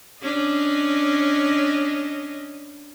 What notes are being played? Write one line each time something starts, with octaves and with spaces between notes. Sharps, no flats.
C#4 D4 D#5